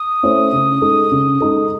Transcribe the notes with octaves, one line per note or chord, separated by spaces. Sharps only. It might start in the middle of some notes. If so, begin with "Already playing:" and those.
Already playing: D#6
A3 C#4 E4 C5
C#3
G#3 D#4 A4
C#3
G#3 D#4 A4